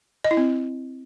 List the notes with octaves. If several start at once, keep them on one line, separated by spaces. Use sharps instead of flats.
D#5
E4
C4